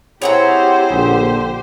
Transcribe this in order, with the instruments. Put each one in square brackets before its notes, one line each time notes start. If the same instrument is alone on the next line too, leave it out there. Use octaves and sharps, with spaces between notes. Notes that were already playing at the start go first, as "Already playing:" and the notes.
[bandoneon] C4 E4 G#4 [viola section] G4 C5 [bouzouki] C#5 F#5 A#5
[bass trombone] A#1 [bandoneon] D3